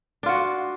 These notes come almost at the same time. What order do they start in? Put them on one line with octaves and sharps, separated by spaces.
D4 F4 F#4